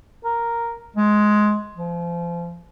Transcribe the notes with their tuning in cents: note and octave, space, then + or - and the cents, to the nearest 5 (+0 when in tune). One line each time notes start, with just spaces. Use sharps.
A#4 +0
G#3 +15
F3 -30